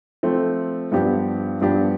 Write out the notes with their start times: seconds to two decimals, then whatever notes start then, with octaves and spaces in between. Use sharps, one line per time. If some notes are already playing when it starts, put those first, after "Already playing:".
0.23 F3 A3 C4
0.92 G2 F3 B3 D4 G4
1.61 G2 F3 B3 D4 G4